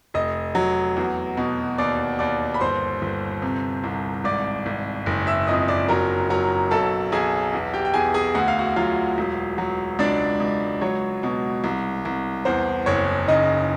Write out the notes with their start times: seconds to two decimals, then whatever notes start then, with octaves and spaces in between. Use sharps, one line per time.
0.14 F1 D#5 D#6
0.55 F#3
0.96 E2
1.37 B2
1.78 D#2 D5 D6
2.19 D#2 D5 D6
2.54 B5
2.61 G1 C5 C6
3.02 G1
3.42 C3
3.84 C2
4.24 G#1 D5 D6
4.66 G#1
5.06 F#1
5.27 E5 E6
5.47 F2 D#5 D#6
5.68 D5 D6
5.88 F#3 A#4 A#5
6.30 F#3 A#4 A#5
6.71 B1 A4 A5
7.12 B1 G#4 G#5
7.53 E2
7.74 G4 G5
7.85 G5
7.94 E2 G#4 G#5
8.14 G#4 G#5
8.35 D2 F#5
8.48 F5
8.59 F#4 F#5
8.76 F#3 F4 F5
9.18 E1
9.58 F#3
9.99 C#2 D4 D5
10.40 C#2
10.81 F#3 C#5
11.23 B2
11.64 C2
12.05 C2
12.45 E2 C5
12.86 F#1 C#5
13.28 C#3 D#4 D#5